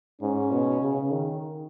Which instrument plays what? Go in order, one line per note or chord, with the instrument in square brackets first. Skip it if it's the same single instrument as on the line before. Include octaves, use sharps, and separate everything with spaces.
[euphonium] G#2 [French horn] C#4
[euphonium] B2
C#3
D#3